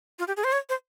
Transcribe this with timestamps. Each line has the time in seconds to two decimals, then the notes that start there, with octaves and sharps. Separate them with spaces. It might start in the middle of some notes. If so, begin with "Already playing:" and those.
0.19 F4
0.28 G4
0.37 G#4
0.44 C5
0.52 C#5
0.69 C5